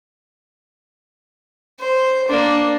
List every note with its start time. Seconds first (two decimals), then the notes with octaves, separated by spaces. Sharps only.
1.80 C5
2.28 A#3 D4